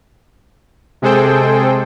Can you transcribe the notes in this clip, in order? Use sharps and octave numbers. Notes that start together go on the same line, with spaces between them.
C3 G#3 G#4 A4 C5 G5